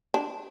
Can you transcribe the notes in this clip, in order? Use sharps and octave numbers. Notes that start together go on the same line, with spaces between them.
D4